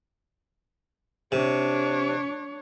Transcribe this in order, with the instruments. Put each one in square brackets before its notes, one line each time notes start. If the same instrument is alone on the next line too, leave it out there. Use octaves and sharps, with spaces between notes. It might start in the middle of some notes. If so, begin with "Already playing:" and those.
[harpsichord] C3 [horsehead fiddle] D4 C#5